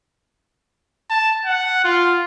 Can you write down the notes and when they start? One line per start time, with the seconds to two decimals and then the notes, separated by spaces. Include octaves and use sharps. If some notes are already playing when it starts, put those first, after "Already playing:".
1.10 A5
1.46 F#5
1.84 F4